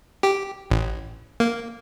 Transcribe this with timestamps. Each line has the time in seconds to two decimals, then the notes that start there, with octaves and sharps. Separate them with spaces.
0.23 G4
0.71 A1
1.40 A#3